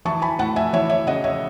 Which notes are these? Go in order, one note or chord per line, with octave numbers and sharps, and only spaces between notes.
E3 A5 C#6
G#5 B5
A2 F#5 A5
E5 G#5
E3 C#5 E5
C#5 E5
C#3 D#5 F#5
C#5 E5